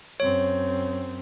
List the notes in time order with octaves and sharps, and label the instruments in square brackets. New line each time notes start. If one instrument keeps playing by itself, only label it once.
[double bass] F#2 C4 [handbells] C#5